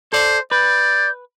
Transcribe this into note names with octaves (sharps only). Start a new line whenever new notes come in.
A4 C5 D5
B4 D5 G6